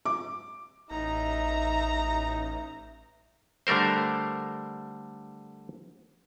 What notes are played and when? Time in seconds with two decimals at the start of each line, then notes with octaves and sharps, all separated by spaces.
0.05 D6
0.91 A1 D#4 E5 A#5
3.67 D3 G3 A3 A#4 C5